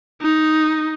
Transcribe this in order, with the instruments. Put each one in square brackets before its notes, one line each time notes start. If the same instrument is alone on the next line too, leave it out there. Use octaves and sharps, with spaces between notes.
[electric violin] D#4